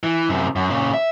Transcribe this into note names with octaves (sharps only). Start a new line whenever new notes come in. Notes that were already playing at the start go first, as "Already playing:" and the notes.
E3
F#2 C3
F#2
A#2 C#3
E5